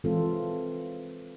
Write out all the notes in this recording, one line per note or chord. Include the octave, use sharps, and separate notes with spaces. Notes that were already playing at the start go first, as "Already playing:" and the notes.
E3 G#3 C4 F4 A4